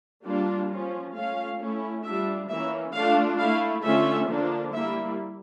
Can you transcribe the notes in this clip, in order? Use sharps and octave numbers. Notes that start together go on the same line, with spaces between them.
G3 A#3 D4 F4
F3 C#4 F4
A3 C#4 F4 F5
A3 C#4 E4
G3 D4 F4 E5
E3 A#3 C#4 E5
A3 D4 F4 F5
A3 E4 F5
D3 A3 C#4 F4 E5
D3 F3 A#3 D4
G3 A#3 E4 E5